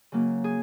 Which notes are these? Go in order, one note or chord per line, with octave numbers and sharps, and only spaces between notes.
C#3 F#3 A#3
G#4